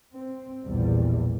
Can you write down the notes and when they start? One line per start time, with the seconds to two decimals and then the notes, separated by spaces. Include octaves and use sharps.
0.11 C4
0.64 A#1 E2 B2 G3